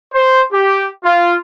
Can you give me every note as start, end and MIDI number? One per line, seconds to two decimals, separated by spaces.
0.13 0.41 72
0.52 0.87 67
1.04 1.35 65